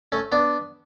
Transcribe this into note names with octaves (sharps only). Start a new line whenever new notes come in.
A3 C#4
B3 D4